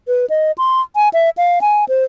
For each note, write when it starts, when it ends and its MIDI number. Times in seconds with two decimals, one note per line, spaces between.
0.08 0.26 71
0.30 0.51 75
0.58 0.81 84
0.96 1.08 80
1.13 1.30 76
1.37 1.59 77
1.61 1.84 80
1.88 2.04 72